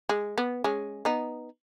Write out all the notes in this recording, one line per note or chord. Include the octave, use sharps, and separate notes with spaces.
G#3
B3
G#3 C#4
B3 D#4